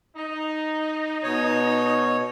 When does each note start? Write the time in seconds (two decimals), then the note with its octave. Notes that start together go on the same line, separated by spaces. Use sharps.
0.16 D#4
1.23 B2 C#5